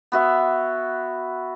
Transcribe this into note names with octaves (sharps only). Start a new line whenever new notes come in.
B3 F#4 E5